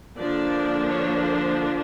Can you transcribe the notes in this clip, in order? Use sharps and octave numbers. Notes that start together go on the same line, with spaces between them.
D3 F3 A#3 D4 D5
C#5
C5